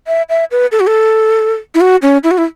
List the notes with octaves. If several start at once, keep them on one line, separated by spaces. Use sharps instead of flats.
E5
E5
B4
A4
F#4
A4
E4
F#4
C#4
E4
F#4
E4